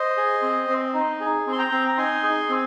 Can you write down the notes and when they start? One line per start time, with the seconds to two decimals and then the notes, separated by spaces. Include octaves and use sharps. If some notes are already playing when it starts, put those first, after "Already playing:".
Already playing: C5 D#5
0.17 G#4
0.42 C4
0.69 C4
0.94 D#4
1.20 G#4
1.47 C4
1.52 C6
1.58 G5 A#5
1.72 C4
1.88 A#5
1.97 D#4 G#5 C6
2.23 G#4
2.49 C4